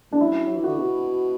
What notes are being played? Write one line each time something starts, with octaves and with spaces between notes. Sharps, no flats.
E2 D4
F#2 E4
F#3
E3
D3 F#4
B2